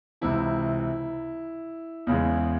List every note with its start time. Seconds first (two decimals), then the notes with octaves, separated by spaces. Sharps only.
0.21 C#2 C3 E3 E4
2.07 E2 C#3 E3 G#3